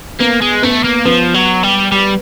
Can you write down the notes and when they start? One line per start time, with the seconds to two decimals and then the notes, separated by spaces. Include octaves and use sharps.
0.19 A#3 B3 B4
0.42 G#3
0.62 A3 B3 B4
0.84 A#3
1.05 F3 B3 B4
1.34 F#3
1.63 G3
1.92 G3